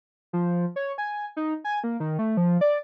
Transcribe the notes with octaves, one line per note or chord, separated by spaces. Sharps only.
F3
C#5
G#5
D#4
G#5
A#3
D#3
A3
F3
D5